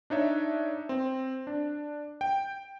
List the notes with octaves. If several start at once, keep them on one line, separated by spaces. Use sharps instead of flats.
D4 D#4 C#5 E5
C4
D4
G5